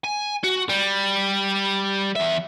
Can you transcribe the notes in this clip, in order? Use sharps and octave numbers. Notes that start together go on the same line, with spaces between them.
G#5
F#4
G3
E2 E5